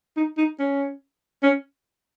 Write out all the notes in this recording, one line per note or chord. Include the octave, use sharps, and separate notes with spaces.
D#4
D#4
C#4
C#4